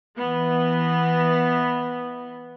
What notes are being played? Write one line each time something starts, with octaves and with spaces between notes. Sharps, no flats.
E3 B3